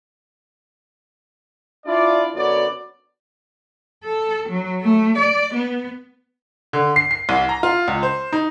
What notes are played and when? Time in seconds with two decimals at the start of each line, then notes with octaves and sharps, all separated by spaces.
1.86 D4 E4 F4 D5
2.36 F#2 D3 B3 F#4 C#5 D5
4.04 A4
4.49 F#3
4.81 A3
5.18 D5
5.54 B3
6.73 D3
6.96 C7
7.11 C7
7.29 C2
7.49 A#5
7.63 F4
7.88 C#2
8.03 C5
8.33 D#4